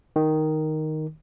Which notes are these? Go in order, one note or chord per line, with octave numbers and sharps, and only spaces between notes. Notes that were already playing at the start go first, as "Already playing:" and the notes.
D#3